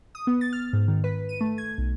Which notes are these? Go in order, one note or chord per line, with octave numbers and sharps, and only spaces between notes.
D#6
B3
A6
F6
G#2
D#3
B4
D#7
A3
G#6
B1